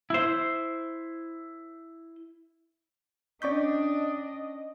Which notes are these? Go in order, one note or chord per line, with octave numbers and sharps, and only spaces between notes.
E4 C5
C#4 D4 D5 D#5 C#6 G6 B6